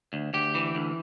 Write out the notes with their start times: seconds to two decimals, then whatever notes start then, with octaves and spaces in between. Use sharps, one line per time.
0.13 D2
0.34 D2 G4
0.55 E3
0.75 D2